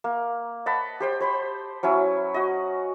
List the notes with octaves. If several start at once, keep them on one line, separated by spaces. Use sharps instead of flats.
A#3
D#5 F#5 A5 B5
G4 C5 G5
C5 B5 C6
F#3 C#4 E4
F#4 D#5